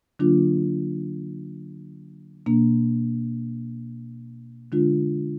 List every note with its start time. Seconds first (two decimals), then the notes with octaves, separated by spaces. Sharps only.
0.19 D3 F#3 A#3 D4 F4
2.46 B2 A#3 D4
4.72 D3 G#3 D4 F4